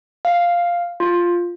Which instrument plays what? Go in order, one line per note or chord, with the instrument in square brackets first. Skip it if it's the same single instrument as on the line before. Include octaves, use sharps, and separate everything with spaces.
[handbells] F5
F4